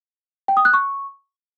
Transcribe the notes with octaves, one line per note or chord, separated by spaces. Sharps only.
G5
D#6
F#6
C#6